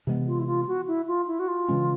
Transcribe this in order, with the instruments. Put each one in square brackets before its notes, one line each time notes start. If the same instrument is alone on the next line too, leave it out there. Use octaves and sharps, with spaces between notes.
[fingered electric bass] C3 E3 G#3 B3
[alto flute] F4
E4
F4
F#4
E4
F4
E4
F#4
F4
[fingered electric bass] C#3 E3 G#3 C#4